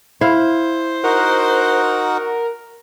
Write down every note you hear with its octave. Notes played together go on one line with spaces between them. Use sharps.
E4 C5 F5
D#4 F#4 A#4 F#5